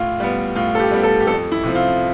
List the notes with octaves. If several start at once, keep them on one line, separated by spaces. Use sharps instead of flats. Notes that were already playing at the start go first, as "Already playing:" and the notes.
Already playing: A2 F4
G3 B3
A2 F4
A4
G4
G3 B3
A4
G4
F2 A4
E4
C3 F3 C4
F4